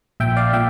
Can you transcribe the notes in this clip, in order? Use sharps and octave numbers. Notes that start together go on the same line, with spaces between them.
A#1 A#2 E5 G5
D5 F5
A#2 E5 G5